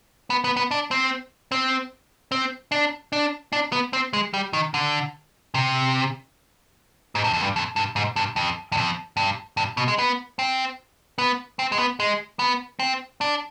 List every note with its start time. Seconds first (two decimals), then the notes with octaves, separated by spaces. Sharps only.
0.30 B3
0.44 B3
0.57 B3
0.71 D4
0.91 C4
1.52 C4
2.32 C4
2.72 D4
3.13 D4
3.53 D4
3.72 B3
3.93 C4
4.13 G#3
4.34 G3
4.53 D#3
4.74 D3
5.54 C3
7.15 G#2
7.24 G2
7.33 F2
7.43 G2
7.56 F2
7.76 G2
7.96 G#2
8.16 G2
8.36 F2
8.72 G2
8.77 F2
9.17 G2
9.57 G2
9.77 B2
9.88 G#3
9.98 B3
10.39 C4
11.18 B3
11.59 C4
11.72 G#3
11.79 B3
12.00 G#3
12.39 B3
12.79 C4
13.21 D4